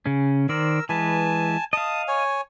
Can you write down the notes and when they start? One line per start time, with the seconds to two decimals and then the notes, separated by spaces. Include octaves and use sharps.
0.06 C#3 C#4
0.49 D#3 A#4 C5 D5 E6
0.89 E3 G#3 B4 G#5 A5
1.73 D#5 F5 A5 D#6
2.08 C#5 G#5